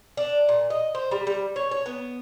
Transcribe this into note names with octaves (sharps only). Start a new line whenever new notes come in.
D4
A#2
D#5
C5
G3
G3
C#5
C#5
B3